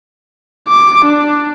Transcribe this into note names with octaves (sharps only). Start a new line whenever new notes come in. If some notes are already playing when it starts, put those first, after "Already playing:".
D6
D4